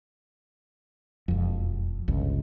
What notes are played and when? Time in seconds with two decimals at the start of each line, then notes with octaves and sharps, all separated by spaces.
1.28 E1 F2
2.08 G1 C#2